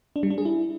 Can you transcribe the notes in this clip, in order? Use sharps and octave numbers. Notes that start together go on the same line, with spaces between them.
D4
G3
D4
G#4
E4